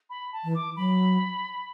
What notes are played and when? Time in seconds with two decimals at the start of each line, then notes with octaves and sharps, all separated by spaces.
0.10 B5
0.33 A5
0.44 E3
0.55 D6
0.76 F#3 B5